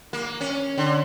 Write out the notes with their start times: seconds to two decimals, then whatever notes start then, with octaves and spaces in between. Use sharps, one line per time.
0.13 A#3
0.41 C#4
0.78 D3